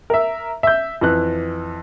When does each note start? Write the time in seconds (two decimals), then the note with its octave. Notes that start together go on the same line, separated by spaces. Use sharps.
0.10 A#4 E5
0.63 E5 G6
1.01 F2 E3 F#6